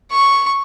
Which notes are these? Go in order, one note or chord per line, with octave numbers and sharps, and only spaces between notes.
C#6